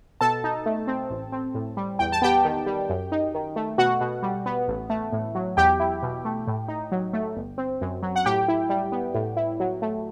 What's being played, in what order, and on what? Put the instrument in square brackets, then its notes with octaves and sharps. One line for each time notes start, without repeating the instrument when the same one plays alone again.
[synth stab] B2 A4 A5
D#4
A3
C4
A1
C4
A2
G3
E2 G5
A5
B3 G4 G5
D#3
G3
F#2
D#4
D#3
A3
B2 F#4 F#5
B2
G3
B3
A1
A3
A2
F#3
E2 G4 G5
E4
B2
A3
A2
D#4
F#3
A3
G1
C4
F#2
F#3
F#5
A2 G4 G5
E4
G3
B3
A2
E4
F#3
A3